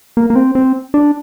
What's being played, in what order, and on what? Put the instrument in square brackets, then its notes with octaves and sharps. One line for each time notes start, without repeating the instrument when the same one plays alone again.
[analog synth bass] A#3
A#3
C4
C4
D4